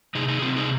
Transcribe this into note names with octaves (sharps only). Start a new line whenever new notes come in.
C3 D#4 G#4
D#4 G#4
C3 C4 F4
D#4 G#4